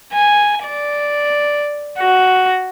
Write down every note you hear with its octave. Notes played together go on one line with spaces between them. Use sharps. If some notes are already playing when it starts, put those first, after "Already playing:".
G#5
D5
F#4